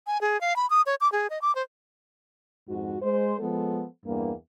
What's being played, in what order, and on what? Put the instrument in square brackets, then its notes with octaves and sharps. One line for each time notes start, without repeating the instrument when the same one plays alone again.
[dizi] G#5
G#4
F5
B5
D#6
C#5
D6
G#4
D#5
D6
C5
[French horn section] F2 G#2 F#4
G#3 C5
F3 G#3 B3 A4
E2 G2 A#3